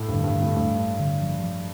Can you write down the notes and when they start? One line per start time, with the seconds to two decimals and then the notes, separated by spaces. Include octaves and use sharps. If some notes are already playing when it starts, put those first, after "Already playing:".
Already playing: A2 A3
0.08 G2 D3
0.24 G2
0.35 D3
0.41 A2
0.56 G2 A3
0.78 D4
1.00 D3
1.21 F3
1.43 F3